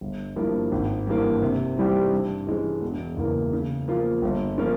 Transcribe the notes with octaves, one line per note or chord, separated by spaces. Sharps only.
G1
G2 F3 A#3 E4
G#1
G2 E3 A#3
C3
E3 G3 C4 G4
G2
E3 G#3 C#4
E1
E2 C#3 E3 A#3
C#3
F3 A#3 F4
G1
F3 A#3 C#4